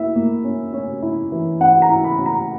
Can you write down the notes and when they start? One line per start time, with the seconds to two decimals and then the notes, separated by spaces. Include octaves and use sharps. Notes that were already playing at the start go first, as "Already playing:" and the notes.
Already playing: A#3 E4 E5
0.16 A#3
0.44 C#4
0.73 C#4
1.03 E4
1.32 E3
1.60 C#4 F#5
1.82 A#5
1.90 E4
2.04 B5
2.18 C#4
2.26 A#5